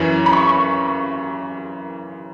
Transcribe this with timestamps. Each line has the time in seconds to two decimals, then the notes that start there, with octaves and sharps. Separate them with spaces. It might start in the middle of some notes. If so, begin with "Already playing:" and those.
Already playing: F#2 E3 C#4 E4
0.26 B5
0.33 C#6